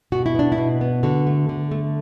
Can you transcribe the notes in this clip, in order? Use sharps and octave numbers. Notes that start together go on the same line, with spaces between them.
B2 F#4
E4
B3 D4
E4
B2
B3
D3 F#4
A3
D3
A3